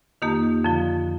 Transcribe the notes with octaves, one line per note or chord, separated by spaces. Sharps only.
F2 D#3 A#3 D#4 G4
F2 D3 F3